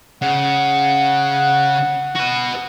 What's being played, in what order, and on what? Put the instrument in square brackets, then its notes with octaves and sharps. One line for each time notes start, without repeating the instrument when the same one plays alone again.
[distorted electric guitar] C#3 [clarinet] F#5
[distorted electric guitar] F#4 B4